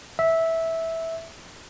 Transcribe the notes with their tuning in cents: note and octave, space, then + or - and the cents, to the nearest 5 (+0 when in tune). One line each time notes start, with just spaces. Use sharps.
E5 -10